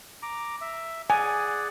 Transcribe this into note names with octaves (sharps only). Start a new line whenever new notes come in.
A#5 D6
E5
G#4 D5 F#5 G#5